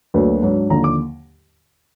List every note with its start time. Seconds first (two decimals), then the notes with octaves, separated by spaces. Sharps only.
0.14 D2 D3 F#3 A#3 B4
0.42 G#2 F#3 D4
0.70 D#2 D3 F3 A#5
0.84 D6